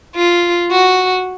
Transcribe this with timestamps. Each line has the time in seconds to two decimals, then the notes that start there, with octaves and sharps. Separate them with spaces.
0.16 F4
0.71 F#4